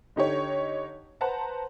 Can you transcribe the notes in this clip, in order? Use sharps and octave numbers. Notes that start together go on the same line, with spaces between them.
D3 D#4 G4 C#5
B4 C5 F#5 A5 A#5